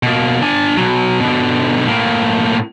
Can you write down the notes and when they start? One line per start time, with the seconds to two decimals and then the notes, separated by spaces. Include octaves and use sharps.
0.03 B2 A#3
0.42 D4 G#5
0.77 B2 F#3
1.21 B2 D3
1.87 A2 A#3